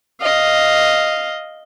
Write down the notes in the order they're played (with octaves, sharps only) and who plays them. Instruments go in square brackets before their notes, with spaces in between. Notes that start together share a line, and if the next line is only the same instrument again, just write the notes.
[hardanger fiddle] D#5 [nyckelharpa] F5